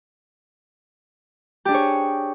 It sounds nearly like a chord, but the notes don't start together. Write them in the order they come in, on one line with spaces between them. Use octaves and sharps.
G4 D4 G#4 C#5